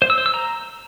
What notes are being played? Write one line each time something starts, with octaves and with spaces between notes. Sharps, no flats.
C5
E6
C5
E6
A#5